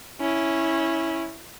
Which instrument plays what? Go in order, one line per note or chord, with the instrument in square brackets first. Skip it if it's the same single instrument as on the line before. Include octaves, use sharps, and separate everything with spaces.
[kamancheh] C#4 E4